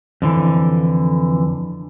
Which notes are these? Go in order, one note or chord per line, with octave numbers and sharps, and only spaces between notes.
F2 D3 E3